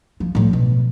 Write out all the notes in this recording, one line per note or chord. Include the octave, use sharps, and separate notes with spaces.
F3
A2 F3
B2